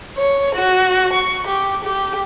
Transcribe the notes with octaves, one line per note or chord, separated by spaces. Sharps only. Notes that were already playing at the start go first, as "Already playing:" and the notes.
C#5
F#4
C#6
G4
G4